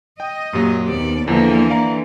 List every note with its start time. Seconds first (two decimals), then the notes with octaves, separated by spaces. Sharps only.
0.20 D#5 G5
0.53 F#2 A#2 F#3 G4
0.88 D#2 B3 C4 D5
1.28 E2 D3 E3 F3 A#3 E4 A4
1.70 D5 F5 A#5